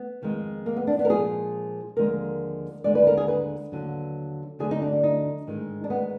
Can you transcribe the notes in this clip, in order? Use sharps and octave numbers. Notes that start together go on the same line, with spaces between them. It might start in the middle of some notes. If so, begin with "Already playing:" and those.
Already playing: B3
F2 D#3 G#3
A#3
B3
D4
B3
A#4
A#2 F3 G#3 G#4
D#2 D3 F3 G#3 A#4
D#2 D3 F3 G#3 D5
B4
A#4
G#4
B4
D#2 D3 F#3
D2 D3 F#3 G#4
D#4
D4
D4
D#4
G#2 D#3 G#3
D4
B3